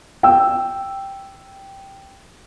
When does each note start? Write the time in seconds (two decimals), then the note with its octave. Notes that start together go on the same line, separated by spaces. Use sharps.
0.23 G5 E6